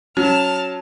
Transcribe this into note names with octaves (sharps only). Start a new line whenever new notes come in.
F#3 C#4 A5 F6